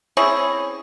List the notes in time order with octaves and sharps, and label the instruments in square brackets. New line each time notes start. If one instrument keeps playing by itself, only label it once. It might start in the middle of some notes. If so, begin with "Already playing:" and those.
[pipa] C4 C#4 E4 G#4